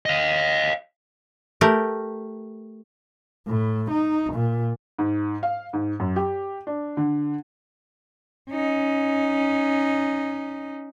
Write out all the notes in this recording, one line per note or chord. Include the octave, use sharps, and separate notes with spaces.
D#5 F5
A3 G4 A#4
A2
D#4
A#2
G#2
F5
G#2
F#2
G4
D4
D3
C#4 D#4